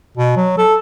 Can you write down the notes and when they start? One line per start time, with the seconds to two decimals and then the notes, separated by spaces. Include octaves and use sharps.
0.17 B2
0.36 F#3
0.58 A4